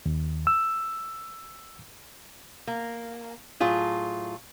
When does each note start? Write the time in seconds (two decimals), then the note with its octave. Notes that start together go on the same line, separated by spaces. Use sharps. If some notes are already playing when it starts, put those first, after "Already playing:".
0.06 D#2
0.47 E6
2.67 A#3
3.60 A2 F#3 F4 G#4